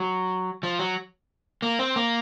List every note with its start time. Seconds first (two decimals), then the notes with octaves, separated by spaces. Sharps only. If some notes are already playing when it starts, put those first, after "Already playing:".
Already playing: F#3
0.63 F3
0.79 F#3
1.62 A#3
1.79 C4
1.96 A#3